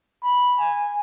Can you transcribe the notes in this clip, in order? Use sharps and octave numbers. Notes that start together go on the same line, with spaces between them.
B5
G#5